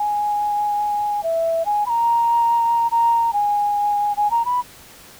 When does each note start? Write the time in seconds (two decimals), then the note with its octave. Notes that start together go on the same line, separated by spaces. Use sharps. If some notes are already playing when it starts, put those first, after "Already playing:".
Already playing: G#5
1.23 E5
1.66 G#5
1.86 B5
1.89 A#5
2.91 A#5
3.33 G#5
4.17 G#5
4.31 A#5
4.45 B5